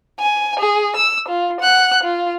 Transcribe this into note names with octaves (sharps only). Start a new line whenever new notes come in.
G#5
G#4
E6
F4
F#5 F#6
F4